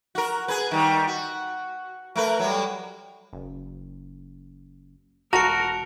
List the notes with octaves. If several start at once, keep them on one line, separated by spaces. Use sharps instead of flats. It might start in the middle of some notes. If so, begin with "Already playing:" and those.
F#4 A#4
G#4 B4
D#3 G3
F#4
A3 A#4 B4
F#3 G3
F#1
E1 F#4 A#4 A5 A#5 C#7